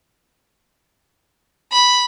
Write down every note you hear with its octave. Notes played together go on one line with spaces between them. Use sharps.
B5